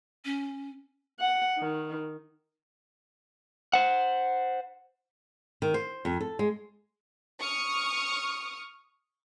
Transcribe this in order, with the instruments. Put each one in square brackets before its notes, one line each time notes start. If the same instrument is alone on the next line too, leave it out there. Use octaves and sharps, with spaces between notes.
[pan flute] C#4
[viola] F#5
D#3
[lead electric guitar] C5 F#5
[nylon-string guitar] D#3
C5
F2
A4
G#3
[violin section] C#6 D#6 F6